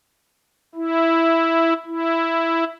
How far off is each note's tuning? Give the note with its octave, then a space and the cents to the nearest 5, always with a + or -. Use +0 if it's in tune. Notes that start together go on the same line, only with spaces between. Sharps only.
E4 +0
E4 +5